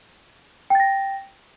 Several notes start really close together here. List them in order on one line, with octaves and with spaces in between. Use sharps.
G5 A6 A#6